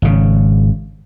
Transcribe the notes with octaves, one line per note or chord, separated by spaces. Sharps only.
G#1 C#3